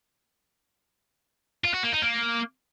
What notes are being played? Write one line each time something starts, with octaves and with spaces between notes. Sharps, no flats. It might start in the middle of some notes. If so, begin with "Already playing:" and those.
F4
F#4
A#3
D#4
A#3